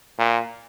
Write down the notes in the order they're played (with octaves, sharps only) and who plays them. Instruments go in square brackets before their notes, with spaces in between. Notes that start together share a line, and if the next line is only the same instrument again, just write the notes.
[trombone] A#2